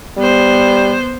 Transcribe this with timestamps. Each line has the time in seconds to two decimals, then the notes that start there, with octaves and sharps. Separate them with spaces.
0.18 G3 B3 C5